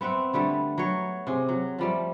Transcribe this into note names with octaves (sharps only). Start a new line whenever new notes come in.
B3 C4 E5 F#5
D3 G3 A3 B3
F#3 C#5
C3 G#4
F#3
F3 G3 A3